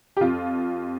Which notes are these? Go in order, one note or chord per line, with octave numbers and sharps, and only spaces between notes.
G4
F2 F4